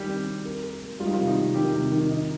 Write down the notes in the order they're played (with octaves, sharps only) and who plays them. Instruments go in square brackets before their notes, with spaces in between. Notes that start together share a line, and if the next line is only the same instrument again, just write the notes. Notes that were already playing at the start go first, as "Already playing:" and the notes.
Already playing: [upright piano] D#3 [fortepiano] G3 G4
[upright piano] C4
C4
A#4
A#4
A#3
[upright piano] G3 [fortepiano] F4
[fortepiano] D#4
F3 F4
[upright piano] C3
[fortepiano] D#3 D#4
[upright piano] C3
[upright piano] D#3 [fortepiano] G3 G4
[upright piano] C3
D#3
D#4